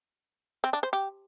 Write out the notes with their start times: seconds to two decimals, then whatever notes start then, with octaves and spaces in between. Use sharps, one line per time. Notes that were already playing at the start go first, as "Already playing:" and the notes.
0.64 C4
0.73 D4
0.83 C5
0.93 G4